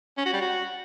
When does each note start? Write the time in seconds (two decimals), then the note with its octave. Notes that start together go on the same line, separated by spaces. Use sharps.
0.18 C#4
0.25 F#4
0.33 G3
0.41 F#4